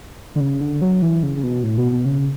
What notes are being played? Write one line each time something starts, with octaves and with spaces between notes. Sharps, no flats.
D3
C#3
D3
F#3
E3
C#3
C#3
B2
A2
B2
B2
C#3